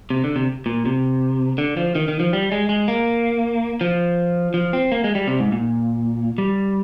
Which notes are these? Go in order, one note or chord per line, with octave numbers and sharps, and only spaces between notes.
C3
D3
C3
A#2
C3
D3
F3
D#3
D#3
F3
G3
G#3
G#3
A#3
F3
F3
C4
A#3
G#3
G3
C3
G#2
A#2
G3